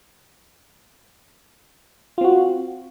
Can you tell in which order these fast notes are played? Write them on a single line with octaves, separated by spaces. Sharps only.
F4 C4 F#4